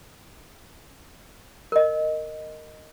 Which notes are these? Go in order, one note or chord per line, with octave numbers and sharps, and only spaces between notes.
A#4 D#5